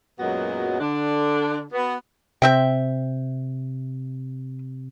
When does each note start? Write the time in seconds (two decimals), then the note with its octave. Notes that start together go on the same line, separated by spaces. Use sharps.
0.19 F#2 A#2 F#3 G#3 B3 F#4
0.80 D3 D4
1.73 B3 F#4
2.42 C3 C4 E5 G5